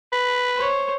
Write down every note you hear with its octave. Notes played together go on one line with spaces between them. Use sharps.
B4
C5 C#5